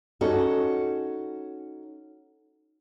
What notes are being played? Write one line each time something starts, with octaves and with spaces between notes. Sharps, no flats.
C#4 D#4 F#4 A4